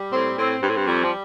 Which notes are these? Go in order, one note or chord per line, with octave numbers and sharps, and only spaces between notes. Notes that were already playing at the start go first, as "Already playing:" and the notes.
Already playing: G3
A2 C4
A2 C4
G2 C4
A2
G2
F2 G3
F3